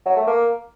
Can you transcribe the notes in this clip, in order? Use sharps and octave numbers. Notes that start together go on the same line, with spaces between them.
F#3
A3
A#3